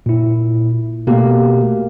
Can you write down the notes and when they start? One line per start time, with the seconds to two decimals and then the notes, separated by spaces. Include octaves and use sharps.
0.06 A#2 E4
1.07 B2 A3 A#3 G4